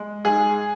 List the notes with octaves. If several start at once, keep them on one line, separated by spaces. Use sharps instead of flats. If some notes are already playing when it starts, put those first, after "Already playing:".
Already playing: G#3
G#2 G#4